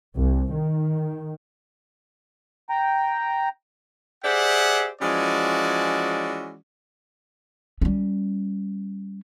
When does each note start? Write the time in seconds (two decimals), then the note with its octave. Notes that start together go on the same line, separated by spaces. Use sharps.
0.15 C2
0.53 D#3
2.69 G5 A#5
4.24 G4 G#4 C5 D5 E5 F#5
5.01 E3 F3 G#3 C#4 F#4 D5
7.81 G3 C#4